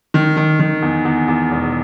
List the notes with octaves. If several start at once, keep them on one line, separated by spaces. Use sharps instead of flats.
D#3
D#3
D#3
E2
E2
E2
E1